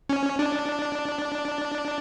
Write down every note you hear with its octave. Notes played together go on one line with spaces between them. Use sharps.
C#4
D4